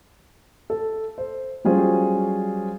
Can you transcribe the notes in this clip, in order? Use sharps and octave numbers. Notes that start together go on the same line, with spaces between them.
A4
C5
F#3 G3 C#4 F4 G#4 C5